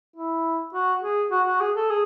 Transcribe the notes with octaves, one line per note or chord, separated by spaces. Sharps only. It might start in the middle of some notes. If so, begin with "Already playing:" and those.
E4
F#4
G#4
F#4
F#4
G#4
A4
G#4